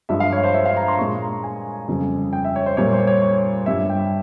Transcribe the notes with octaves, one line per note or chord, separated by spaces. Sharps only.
G2 F3 G#3 E5
F5
C#5
C5
E5
F5
A#5
C6
A#2 G#3 C#6
A#5
G#5
F2 C#3 G3
G5
E5
C#5
C5
A#2 G3 C#5
C5
C#5
C#5
G2 G3 E5
G5